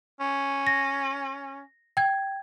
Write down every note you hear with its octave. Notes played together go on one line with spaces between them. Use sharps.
C#4
A#6
G5 G#6